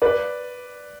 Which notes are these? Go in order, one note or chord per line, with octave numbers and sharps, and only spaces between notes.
B4 D5